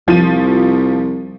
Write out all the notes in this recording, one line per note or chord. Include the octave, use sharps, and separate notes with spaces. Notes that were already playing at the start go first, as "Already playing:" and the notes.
C2 F3 D#7